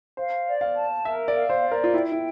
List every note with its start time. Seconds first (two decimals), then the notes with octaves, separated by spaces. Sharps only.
0.17 C5 F5
0.47 D5
0.61 F5
0.76 A5
1.05 A#4 E5
1.28 D5
1.34 F5
1.50 C5
1.64 D5
1.71 A#4
1.84 F4
1.94 E4 G5
2.12 E4